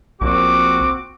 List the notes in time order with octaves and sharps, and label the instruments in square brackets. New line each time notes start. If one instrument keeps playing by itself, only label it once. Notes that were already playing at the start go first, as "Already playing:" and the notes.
[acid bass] A#1 [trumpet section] C4 F#4 D6